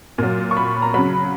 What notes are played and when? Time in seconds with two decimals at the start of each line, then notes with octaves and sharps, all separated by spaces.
0.18 A#2 F#3
0.51 C#6
0.57 B5
0.82 A#5
0.94 C#3 F#3 B5